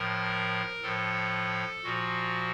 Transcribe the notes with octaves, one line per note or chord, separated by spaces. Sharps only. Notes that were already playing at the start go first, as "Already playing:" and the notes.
Already playing: A2 F3 A#4
A2 F3 A4
A#2 F3 F#4